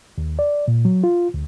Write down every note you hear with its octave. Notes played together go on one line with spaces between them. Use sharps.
D#2
D5
A#2
F#3
F4
D2